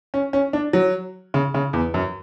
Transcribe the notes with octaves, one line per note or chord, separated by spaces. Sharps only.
C#4
C#4
D4
F#3
C#3
C#3
E2
F#2